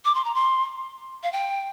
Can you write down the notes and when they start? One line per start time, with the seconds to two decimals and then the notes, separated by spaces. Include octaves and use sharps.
0.05 D6
0.15 C6
0.25 A#5
0.35 C6
1.23 F5
1.32 G5